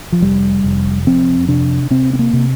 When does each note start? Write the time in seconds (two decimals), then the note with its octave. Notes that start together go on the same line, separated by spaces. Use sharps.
0.12 F3
0.22 F1 G3
0.64 F1
1.07 F2 C4
1.48 C3 D4
1.90 C3 C4
2.13 C4
2.19 A#3
2.33 C3